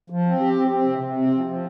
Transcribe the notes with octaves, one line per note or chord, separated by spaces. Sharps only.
F3
C4
G4
C4
C4
C3
C3
C4
F3
F3